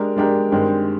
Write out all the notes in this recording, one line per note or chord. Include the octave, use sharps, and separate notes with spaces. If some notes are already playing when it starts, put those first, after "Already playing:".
Already playing: G#3 D4 G4 A#4
G#3 D4 G4 A#4
G2 D#3 G#3 C4 G4